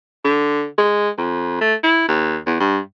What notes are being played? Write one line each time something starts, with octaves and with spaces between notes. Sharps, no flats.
D3
G#3
F2
A3
E4
D#2
E2
G2